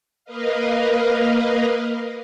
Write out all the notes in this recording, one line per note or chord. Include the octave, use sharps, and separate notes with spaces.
A#3 A#4 B4 D#5 F5